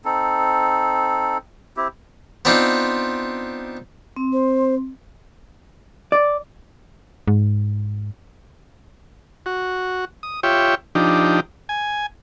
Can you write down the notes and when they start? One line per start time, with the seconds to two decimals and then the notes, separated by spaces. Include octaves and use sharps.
0.05 C4 D#4 A4
1.77 C4 E4 G4
2.45 B3 C4 D4 D#4 F4
4.16 C4
4.33 C5
6.12 D5
7.28 G#2
9.46 F#4
10.23 D#6
10.43 F4 G4 C#5 E5 G5
10.95 F3 D4 D#4 G4
11.69 G#5